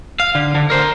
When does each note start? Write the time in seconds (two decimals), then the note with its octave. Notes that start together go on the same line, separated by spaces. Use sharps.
0.20 F5
0.35 D3
0.55 D3
0.70 A#4 C5